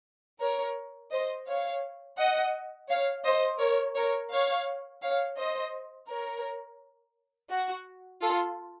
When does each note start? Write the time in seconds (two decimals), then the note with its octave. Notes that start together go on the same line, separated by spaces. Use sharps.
0.41 A#4 C#5
1.12 C5 D#5
1.47 C#5 F5
2.18 D#5 F#5
2.89 C#5 F5
3.24 C5 D#5
3.60 A#4 C#5
3.96 A#4 C#5
4.31 C#5 F5
5.02 C#5 F5
5.38 C5 D#5
6.08 A#4 C#5
7.50 F#4
8.22 F4 A4